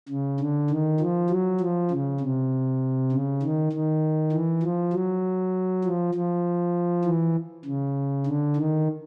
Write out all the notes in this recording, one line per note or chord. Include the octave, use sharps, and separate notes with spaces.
C#3
D3
D#3
F3
F#3
F3
C#3
C3
C#3
D#3
D#3
E3
F3
F#3
F3
F3
E3
C#3
D3
D#3